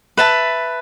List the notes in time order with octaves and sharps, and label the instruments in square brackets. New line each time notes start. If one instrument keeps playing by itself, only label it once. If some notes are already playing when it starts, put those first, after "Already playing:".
[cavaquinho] B4 E5 A5